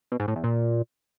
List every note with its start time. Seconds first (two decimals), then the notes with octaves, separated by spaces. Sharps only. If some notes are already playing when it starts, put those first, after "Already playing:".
0.12 B2
0.20 G#2
0.28 A2
0.36 E2
0.44 A#2